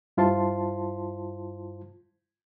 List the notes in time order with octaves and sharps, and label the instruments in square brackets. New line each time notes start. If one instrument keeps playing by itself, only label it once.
[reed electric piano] G2 E4 F4 C5 A5 C6